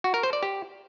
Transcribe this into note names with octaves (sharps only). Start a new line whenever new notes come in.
F#4
A#4
C5
D5
G4